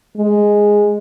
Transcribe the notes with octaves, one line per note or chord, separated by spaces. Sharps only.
G#3